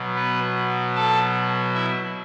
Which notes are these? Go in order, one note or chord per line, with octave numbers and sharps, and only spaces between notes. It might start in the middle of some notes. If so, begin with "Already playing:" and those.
Already playing: B2 F#3
B3 B4
A4 A5
E4 E5